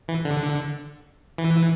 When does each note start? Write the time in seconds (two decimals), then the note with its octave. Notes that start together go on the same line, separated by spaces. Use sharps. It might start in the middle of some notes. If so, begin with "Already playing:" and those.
0.08 E3
0.25 D3
1.38 E3